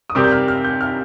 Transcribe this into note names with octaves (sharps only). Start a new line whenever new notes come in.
D#6
C3 G3 C4 G4 A#4 D6
G6
F6
F6
G6
F6